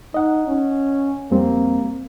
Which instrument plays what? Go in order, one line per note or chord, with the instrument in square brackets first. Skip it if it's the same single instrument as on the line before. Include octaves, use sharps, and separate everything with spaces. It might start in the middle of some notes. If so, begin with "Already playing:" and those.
[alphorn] D#4 [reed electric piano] D#5 F#5
[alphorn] C#4
[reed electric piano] F2 G3 C4 [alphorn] A#3